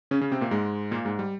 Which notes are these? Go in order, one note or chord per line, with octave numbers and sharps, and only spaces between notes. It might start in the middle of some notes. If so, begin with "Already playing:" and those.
C#3 C#4
C#3 C#4
C3 C4
A#2 A#3
G#2 G#3
A#2 A#3
G#2 G#3
G3